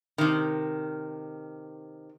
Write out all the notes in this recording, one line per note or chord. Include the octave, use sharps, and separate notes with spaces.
C3 D#3